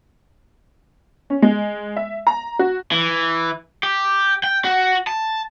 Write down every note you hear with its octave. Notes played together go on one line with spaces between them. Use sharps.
C#4
G#3
E5
A#5
F#4
E3
G4
G5
F#4
A5